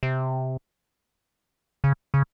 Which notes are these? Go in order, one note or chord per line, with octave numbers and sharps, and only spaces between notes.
C3
C#3
C#3